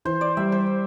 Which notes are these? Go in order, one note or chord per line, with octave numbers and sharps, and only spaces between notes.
E3 C5
D5
G3 E5
C5